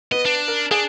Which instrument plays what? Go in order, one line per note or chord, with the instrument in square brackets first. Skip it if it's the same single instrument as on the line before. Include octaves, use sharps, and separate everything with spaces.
[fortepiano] B3 [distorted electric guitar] D#5
[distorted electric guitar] D4
[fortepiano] A#4
[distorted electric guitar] D4 [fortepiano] G#4